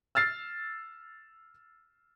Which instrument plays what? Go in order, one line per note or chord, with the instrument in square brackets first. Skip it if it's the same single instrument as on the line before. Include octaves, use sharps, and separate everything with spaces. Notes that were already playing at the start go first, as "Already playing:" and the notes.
[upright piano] E6 F6 A6 C7